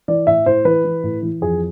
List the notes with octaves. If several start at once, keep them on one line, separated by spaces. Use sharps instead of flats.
E3 D5
A2 E5
A2 C5
E3 B4
E3
A2
E3
F2 G#4